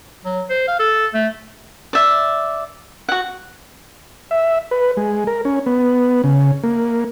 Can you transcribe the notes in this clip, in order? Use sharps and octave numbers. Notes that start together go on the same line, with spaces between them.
F#3
C5
F5
A4
A3
D5 E5
F#4 F#5
E5
B4
G#3
A#4
C#4
B3
C#3
A#3